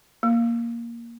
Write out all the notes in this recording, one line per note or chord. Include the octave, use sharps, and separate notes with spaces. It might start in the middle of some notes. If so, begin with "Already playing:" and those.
A#3